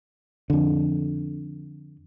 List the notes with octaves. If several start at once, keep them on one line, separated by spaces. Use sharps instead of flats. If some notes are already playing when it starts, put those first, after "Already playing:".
F2 D3